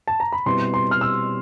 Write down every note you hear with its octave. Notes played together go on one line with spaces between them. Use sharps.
A5
A#5
B5
B2 G3 C4 E4 C6
C6
F6
E6